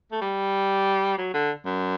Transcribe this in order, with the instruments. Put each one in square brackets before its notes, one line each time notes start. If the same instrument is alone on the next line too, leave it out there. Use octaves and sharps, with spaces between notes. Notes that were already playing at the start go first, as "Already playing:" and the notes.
[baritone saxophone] A3
G3
F#3
D3
F#2